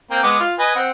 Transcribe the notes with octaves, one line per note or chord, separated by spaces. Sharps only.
A#3 C4 G5
G#3 B3 D6
F4
B4 D#5 G#5
C4 F#5